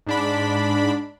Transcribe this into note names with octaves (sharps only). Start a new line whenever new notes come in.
G#2 D4 B5